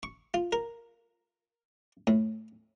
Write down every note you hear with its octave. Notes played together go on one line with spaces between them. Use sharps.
C#6
F4
A#4
A2